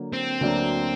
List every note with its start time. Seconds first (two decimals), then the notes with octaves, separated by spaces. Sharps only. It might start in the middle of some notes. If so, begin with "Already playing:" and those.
Already playing: D3 F#3 A#3
0.13 C4
0.41 D2 D3 F#3 A#3 D4